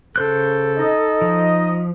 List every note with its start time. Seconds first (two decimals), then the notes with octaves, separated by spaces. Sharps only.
0.16 C#3 A4 C5 F#6
0.77 D#4 D#5
1.22 F3